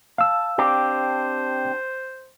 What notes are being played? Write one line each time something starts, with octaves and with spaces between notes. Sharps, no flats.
F5 A5 E6
C4 D4 G4 C5